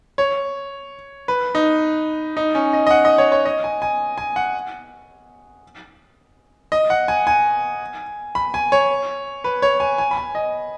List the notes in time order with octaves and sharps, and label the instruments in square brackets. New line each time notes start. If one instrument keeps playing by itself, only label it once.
[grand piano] C#5
B4
D#4
D#4
C#4
D#5
D#5
F#5
D#5
C#5
C#5
D#5
G#5
G#5
G#5
F#5
D#5
F#5
G#5
G#5
B5
G#5
C#5
B4
C#5
G#5
G#5
B5
G#5
D#5